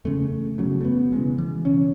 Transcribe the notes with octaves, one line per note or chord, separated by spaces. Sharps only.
F#1 E2 C#3 A3
F#1 E2 C#3 F#3
A3
B3
E1 E2 C#3 G#3
E3
E1 E2 C#3 C#4